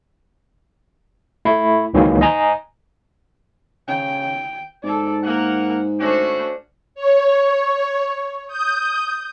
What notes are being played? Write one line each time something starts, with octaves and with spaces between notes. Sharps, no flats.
A3 E4
C#2 D#3 E3 F#3 G#3 A#3
D#5 G#5 A#5
C#3 G5
G#2 A4 D5
A#3 A#4 F#5
A3 C#4 D4 F#4 C5
C#5
D#6 G6